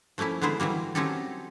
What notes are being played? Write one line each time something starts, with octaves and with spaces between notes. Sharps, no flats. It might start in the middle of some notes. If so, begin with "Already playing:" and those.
F3 A3 A#3 C#4 E4
D3 G#3 B3 E4 C5
E3 F#3 G3 A#3
F#3 C4 C#4 D#4 G4 A4